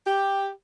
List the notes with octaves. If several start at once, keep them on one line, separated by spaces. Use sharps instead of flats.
G4